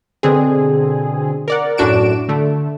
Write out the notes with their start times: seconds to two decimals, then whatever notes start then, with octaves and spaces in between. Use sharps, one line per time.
0.23 B2 D3 C4 G#4
1.48 A#4 D5 F#5
1.78 F#2 A2 D4 F#4 D7 E7
2.29 D3 A3